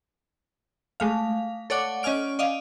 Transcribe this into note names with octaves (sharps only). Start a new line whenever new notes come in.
G#3 A3 F5
A4 C#5 D5 F#5 D6
C#4 D#5 G#5 F6 D7
D5 D#5 F5